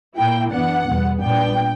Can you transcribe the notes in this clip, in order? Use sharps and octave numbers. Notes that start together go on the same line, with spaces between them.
A#2 A#3 E4 G5
F#2 E3 B3 D4 F#5
E2 B2 G3 B3
A#2 G3 B3 D4 G5